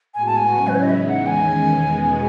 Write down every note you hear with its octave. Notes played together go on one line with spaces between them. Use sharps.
A2 G#3 B3 F#4 G#5
A5
G#5
C#3 F#3 C#4 E4
B4
C#5
D#5
E3 G#3 B3 D#4 E5
F#5
E2 D#3 G#3 C#4 G#5
E2 B2 G#3 B3